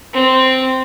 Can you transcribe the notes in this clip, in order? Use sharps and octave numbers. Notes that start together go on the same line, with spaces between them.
C4